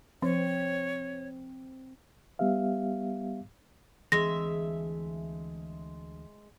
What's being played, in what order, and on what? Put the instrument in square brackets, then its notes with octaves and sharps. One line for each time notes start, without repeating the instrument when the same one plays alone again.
[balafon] F3 [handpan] C4 [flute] C#5
[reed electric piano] G3 B3 G4 E5 F5
[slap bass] D2 E3 C4 [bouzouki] G#3 E5 [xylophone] A#6